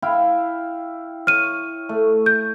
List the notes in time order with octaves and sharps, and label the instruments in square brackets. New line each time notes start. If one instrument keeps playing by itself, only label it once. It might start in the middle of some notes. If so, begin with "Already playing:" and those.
[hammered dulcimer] E4 F5 G5
[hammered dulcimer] C#5 [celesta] F6 D#7
[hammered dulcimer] A3
[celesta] G6